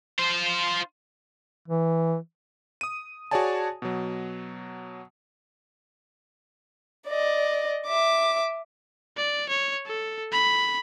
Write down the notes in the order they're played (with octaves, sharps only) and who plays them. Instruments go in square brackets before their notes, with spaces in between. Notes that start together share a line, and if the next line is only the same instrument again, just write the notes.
[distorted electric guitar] F4 C5
[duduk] E3
[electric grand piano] D#6 D#7
F#4 G#4 C#5 D5 G#5 A5
B2 F#3
[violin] D5 D#5
E5 D6
[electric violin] D5
C#5
A4
B5